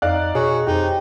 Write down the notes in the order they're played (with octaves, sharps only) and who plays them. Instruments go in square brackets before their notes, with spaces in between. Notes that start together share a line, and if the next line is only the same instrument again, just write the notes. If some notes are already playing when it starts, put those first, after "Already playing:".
[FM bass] F2 [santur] D#4 A#5 [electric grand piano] D5 F5 F#6
[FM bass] B2 [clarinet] F#4 [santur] G#4 [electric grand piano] C#5
[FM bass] F2 [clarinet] D#4 [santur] G4 C5